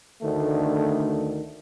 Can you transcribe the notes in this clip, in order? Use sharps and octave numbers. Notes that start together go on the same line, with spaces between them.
D2 D3 D#3 A3